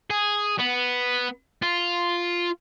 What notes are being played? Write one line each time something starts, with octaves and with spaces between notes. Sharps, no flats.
G#4
B3
F4